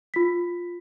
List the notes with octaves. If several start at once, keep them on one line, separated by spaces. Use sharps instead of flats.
F4 B6